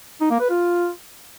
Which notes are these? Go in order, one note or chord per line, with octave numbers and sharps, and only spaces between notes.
D#4
A#3
B4
F4